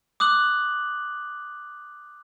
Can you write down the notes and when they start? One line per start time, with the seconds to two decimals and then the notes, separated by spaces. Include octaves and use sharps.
0.20 D6 D#6 F#6 F#7